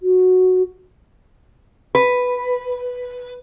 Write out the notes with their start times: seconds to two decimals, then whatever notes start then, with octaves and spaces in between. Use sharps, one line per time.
0.02 F#4
1.95 B4